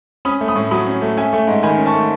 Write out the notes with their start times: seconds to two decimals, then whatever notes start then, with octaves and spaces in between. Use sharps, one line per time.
0.25 C#4 B5 D#6
0.41 A3
0.48 B5 D#6
0.56 A2
0.71 F#3 B5 D#6
0.87 C#4
1.02 A3
1.17 C#4 E5 G#5
1.33 A3
1.47 G#2
1.63 D#3 G#5 B5
1.78 C#4
1.86 A5 C#6
1.94 A3